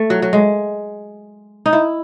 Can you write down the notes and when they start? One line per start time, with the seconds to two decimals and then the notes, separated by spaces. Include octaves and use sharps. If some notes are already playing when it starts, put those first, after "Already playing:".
Already playing: A3
0.10 F#3
0.22 F#3
0.33 G#3
1.66 D#4
1.73 E4